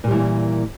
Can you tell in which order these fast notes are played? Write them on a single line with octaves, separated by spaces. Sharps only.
A#2 G3 E3 A#3